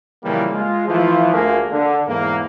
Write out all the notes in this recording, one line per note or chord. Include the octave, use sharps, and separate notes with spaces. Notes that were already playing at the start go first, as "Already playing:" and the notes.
A#2 C#3 E3 F3 G3 A#3
G#3 F4
E3 F3 A3 F4
D2 A3 A#3 F4 G#4 A#4
D3
E2 G#2 E3 A#3